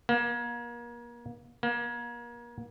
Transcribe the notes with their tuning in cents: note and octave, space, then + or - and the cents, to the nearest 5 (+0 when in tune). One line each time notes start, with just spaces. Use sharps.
A#3 +35
A#3 +35